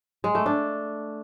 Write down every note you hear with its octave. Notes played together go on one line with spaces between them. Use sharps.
G#3
A3
D4